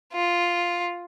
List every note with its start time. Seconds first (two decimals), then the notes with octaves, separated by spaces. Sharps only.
0.13 F4